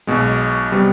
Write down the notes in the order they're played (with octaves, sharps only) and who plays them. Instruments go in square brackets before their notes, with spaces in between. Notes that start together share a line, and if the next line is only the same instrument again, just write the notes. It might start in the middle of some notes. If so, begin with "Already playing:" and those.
[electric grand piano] B1 B2 G#3
C3 G3 B3